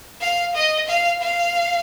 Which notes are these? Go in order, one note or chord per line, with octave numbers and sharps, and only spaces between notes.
F5
D#5
F5
F5